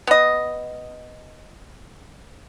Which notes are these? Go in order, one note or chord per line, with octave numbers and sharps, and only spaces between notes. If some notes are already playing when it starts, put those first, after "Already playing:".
B3 D#5